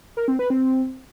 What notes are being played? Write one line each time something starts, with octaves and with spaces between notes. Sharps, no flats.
A#4
C4
B4
C4